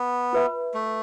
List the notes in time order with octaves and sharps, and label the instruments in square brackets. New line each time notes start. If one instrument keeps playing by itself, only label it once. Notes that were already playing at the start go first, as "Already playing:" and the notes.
Already playing: [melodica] B3
[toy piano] F4 B4 E5 B5
[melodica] A3